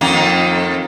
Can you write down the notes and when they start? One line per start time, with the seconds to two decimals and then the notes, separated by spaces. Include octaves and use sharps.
0.01 F2 D#3 A#3